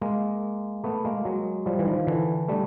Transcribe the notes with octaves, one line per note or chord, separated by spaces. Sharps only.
G#3 A#3
A3 B3
G#3 A#3
F#3 G#3
F3 G3
E3
D#3 F3
D3 E3
G3 A3